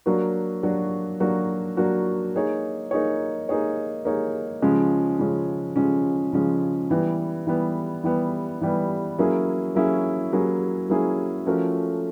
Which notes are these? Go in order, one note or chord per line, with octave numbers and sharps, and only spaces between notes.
F#3 A#3 D4 F#4
F#3 A#3 D4 F#4
F#3 A#3 D4 F#4
F#3 A#3 D4 F#4
A#3 D#4 G#4 C#5
A#3 D#4 G#4 C#5
A#3 D#4 G#4 C#5
A#3 D#4 G#4 C#5
C#3 F3 G#3 C#4
C#3 F3 G#3 C#4
C#3 F3 G#3 C#4
C#3 F3 G#3 C#4
E3 G3 B3
E3 G3 B3
E3 G3 B3
E3 G3 B3
F#3 A#3 C#4 E4 G#4
F#3 A#3 C#4 E4 G#4
F#3 A#3 C#4 E4 G#4
F#3 A#3 C#4 E4 G#4
F3 A3 C#4 F#4 A#4